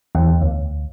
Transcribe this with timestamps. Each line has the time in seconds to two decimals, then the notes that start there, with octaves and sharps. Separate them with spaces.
0.15 E2
0.41 D2